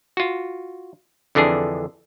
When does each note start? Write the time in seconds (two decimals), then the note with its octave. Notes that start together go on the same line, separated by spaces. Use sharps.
0.17 F4 F#4
1.35 F2 D3 E3 D4 G#4